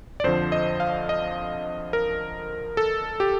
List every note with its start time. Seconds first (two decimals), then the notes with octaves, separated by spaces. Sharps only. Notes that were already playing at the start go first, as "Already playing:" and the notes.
0.20 D5
0.24 F2 D3 F3 C5
0.52 D#5
0.80 F5
1.09 D#5
1.93 A#4
2.77 A4
3.20 G4